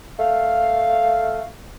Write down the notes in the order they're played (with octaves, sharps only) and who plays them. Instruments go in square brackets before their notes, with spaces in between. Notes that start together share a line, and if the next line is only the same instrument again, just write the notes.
[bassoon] A3 [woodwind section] F5